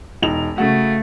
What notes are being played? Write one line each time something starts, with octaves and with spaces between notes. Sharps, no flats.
E1 D#4 F7
C#3 A3 F#4